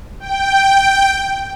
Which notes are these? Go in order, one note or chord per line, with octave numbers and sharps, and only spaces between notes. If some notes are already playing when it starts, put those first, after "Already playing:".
G5